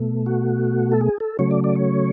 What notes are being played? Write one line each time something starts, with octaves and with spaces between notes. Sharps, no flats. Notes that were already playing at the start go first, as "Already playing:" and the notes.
Already playing: B2 A3
F#4
A4
G#4
A4
C#3 F#3 A3 C#5
D5
D5
C#5